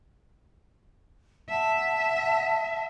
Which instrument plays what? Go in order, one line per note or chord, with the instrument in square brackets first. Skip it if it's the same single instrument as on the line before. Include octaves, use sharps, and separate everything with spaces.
[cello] E5 [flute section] F#5 A5